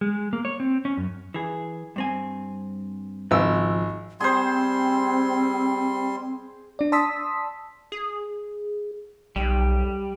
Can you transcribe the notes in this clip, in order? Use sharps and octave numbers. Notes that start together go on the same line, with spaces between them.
G#3
A#3
C#5
C4
C#4
F#2
E3 G#4
G2 C4 G#5
G#1 C#3 F3 E6
G3 C4 G#4 C5 C6
D4 D5
D5 A5 C6 D#6 E6 B6
G#4
B1 G3